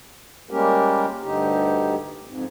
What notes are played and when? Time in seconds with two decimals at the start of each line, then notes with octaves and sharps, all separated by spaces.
0.51 G3 G#3 A#3 C#4 G4 A#4
1.22 D2 G2 D3 D#4 G4
2.26 F2 G#2